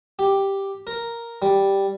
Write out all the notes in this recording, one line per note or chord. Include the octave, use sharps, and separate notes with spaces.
G4
A#4
G3